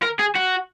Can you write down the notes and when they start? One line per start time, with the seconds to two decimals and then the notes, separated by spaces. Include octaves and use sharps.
0.03 A#4
0.19 G#4
0.36 F#4